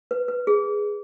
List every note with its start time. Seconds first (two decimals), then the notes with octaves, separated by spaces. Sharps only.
0.11 B4
0.28 B4
0.47 G#4